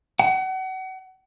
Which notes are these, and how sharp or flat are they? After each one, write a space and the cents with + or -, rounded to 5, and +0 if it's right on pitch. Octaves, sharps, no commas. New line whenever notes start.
F#5 +35